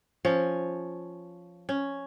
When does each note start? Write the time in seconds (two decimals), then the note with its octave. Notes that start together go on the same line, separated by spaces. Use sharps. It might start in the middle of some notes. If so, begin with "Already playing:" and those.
0.25 F3 C#4
1.69 C#4